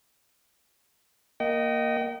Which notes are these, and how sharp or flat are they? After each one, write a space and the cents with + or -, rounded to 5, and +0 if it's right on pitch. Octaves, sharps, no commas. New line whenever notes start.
A#3 +0 D#5 +0 G5 -40